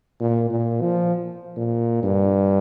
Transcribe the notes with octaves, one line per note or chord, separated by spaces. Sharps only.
A#2
A#2
F3
A#2
G2